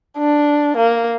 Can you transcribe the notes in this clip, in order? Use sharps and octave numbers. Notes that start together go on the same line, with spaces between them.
D4
A#3